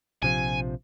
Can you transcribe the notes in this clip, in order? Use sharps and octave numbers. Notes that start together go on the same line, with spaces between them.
A#1 C3 F3 G#5